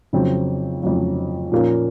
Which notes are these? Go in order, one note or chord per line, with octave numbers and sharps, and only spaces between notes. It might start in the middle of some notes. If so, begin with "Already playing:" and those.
F2 C#3 F#3 C4
F2 C#3 F#3 C4
A#2 F3 A#3 C#4